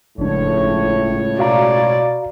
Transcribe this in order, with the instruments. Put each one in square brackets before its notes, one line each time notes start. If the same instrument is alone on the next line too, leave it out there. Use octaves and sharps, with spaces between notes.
[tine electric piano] G1 D4 [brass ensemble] C#2 A2 C#5 [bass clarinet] F3
[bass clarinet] B2 [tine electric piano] F#4 F5 A#5 [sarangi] D5